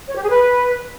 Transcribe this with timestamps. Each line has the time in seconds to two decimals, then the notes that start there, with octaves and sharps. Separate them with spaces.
0.08 C#5
0.15 G4
0.23 G#4
0.30 B4